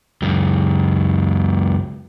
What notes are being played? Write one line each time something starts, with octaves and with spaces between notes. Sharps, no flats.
C#2 F#2